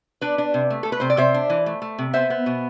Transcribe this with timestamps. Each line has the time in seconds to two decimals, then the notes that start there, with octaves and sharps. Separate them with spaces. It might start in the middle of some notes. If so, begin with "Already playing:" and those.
0.21 D4 B4 D5
0.38 D4
0.54 C3
0.70 A3
0.83 A3 A4
0.92 B4
1.00 C3 C5
1.10 D5
1.17 C3 C5 E5
1.34 D4
1.50 E3
1.66 A3
1.82 A3
1.98 C3
2.13 B3 C5 E5
2.30 B3
2.46 B2